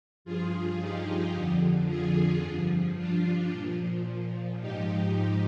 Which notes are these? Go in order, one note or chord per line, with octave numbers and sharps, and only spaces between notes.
G2 F3 F4 G#4
D#4 G4
F2 D3 F3
F4 G#4
G2 F3
D4 F4
A#2 F3
G#2 F3 D#4 G4
D#4 G4